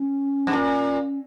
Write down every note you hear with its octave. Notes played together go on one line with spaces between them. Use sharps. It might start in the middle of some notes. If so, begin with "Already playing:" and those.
Already playing: C#4
G2
A#2